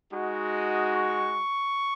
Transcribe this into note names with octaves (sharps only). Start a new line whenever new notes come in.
G#3 D#4 F#4
D#6
C#6